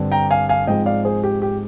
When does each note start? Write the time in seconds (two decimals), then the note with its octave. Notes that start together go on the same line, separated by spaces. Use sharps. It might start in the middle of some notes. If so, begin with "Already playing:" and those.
Already playing: G2 D3 G3 C4
0.12 G5 A#5
0.30 F5 G#5
0.49 F5 G#5
0.67 G#2 F3 G#3 C4 D#5 G5
0.86 D5 F5
1.05 G#4 C5
1.24 G4
1.42 G4